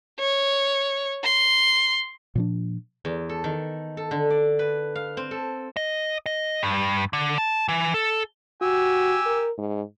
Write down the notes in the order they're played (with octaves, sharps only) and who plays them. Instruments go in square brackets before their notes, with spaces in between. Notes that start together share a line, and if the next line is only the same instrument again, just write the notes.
[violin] C#5
C6
[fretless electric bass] A#2 F3 D4
[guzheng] E2
A4
D#3
A4
D3
D5
B4
F5
C4
A4
[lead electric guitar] D#5
D#5
G2
D3
A5
E3
A4
[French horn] F#4 [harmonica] G4 G#5 E6
[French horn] A#4
G#2